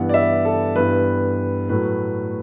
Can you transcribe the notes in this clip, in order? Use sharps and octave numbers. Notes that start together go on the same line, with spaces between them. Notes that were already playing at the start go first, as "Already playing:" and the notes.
Already playing: G2 E3 B3 F#5
D5
E5
A4
G2 E3 B3 B4
A2 F#3 A3 B4